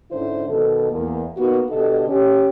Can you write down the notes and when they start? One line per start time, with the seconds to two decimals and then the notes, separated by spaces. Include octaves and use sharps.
0.11 G#2 D3 C#4 E4 C5
0.47 B2 D#3 A4
0.90 E2 A#3
1.36 A#3 B3 D#4 F#4
1.69 B2 D3 G4 A4 D#5
2.06 C#4 G4